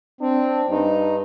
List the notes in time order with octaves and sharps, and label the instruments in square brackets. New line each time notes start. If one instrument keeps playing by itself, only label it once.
[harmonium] C4 [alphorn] D4
[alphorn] G2 [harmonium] D#4